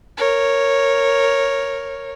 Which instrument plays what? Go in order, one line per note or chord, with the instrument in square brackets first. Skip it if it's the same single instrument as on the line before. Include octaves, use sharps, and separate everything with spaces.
[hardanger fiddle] A#4 C#5